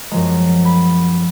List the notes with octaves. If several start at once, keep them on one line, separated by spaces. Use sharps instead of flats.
F#2 F3 G#3 A#5
B5